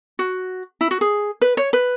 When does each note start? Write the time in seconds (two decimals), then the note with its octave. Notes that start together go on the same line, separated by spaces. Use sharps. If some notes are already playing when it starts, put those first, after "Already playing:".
0.19 F#4
0.81 E4
0.91 F#4
1.01 G#4
1.41 B4
1.57 C#5
1.73 B4